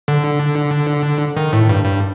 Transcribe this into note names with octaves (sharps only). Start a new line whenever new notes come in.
D3
D#3
A2
G2
G2